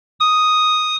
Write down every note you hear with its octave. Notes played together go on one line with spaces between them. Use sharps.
D#6